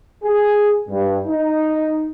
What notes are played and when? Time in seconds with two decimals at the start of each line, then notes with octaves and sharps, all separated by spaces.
0.24 G#4
0.90 G2
1.27 D#4